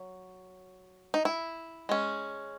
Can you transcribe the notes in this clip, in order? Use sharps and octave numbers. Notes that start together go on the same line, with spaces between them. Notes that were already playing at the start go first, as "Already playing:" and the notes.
Already playing: F#3
D#4
E4
G#3 C#4